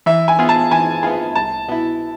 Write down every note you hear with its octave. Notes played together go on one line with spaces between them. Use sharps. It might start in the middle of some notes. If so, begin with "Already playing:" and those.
E3 E5
G#5
B3 F4 G#4
A5
E3 G#5
B3 F4 G#4 G#5
C2 A5
B2 B3 E4